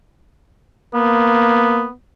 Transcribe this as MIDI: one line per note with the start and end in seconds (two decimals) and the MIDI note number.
0.94 1.86 58
0.94 1.92 59